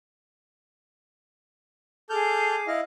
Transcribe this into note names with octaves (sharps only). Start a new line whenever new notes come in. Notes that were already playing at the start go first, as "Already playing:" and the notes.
G#4 A4 D6 F6 G6
E4 D#5 F5